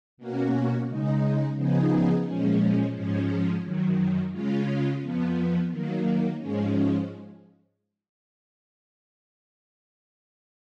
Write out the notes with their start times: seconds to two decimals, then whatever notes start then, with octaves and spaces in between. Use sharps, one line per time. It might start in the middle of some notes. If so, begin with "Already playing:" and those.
0.17 B2 A#3 C#4 F#4
0.87 C#3 G#3 D#4
1.55 C#3 F3 B3 D#4 G#4
2.26 A#2 F3 G#3 C#4
2.95 G#2 F3 G#3 C#4
3.63 F#2 D#3 F#3
4.32 C#3 G#3 C#4 F4
5.01 F2 F3 B3
5.70 D#3 F#3 A#3
6.39 G#2 F3 G#3 C#4